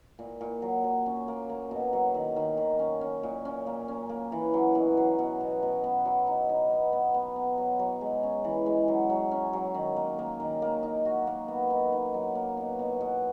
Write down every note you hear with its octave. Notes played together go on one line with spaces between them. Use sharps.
A#2
A#2
F#3
F#3
C#4
A#3
A#3
B2
F#3
D#3
D#3
D#3
C#4
C#4
A#2
C#4
A#3
C#4
A#3
E3
F#3
B2
F#3
B2
B2
B2
B3
F#3
D#4
D#4
B3
B3
B3
B3
F#3
F#3
G#3
C#4
E3
G#3
F#3
F#3
C#4
F#3
D#3
A#3
A#3
D#3
A#3
D#4
F#4
A#3
B3
D#4
D#4
F#3
A#3
B2
B2
B2